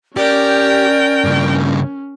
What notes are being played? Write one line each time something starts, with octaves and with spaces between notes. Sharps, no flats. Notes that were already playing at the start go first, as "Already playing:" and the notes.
C#4 G4 A#4 D5 G5
G2 C#3